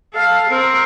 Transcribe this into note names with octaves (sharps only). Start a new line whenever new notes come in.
A4 F5
C4 A#4